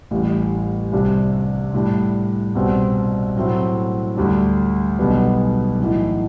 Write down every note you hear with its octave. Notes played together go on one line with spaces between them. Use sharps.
A1 A2 G3
C2 C3 G3 D4
A2 G3 D4
C2 B2 G3 C4
A2 F#3 A3 C4 E4
D2 D3 G3 D4
B1 B2 G3 B3
B1 A2 E3